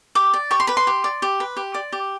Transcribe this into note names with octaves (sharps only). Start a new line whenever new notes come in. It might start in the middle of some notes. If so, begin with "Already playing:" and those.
G4 D6
D5
G4 C#6
C6
B4 B5
C6
G4
D5
G4
B4
G4
D5
G4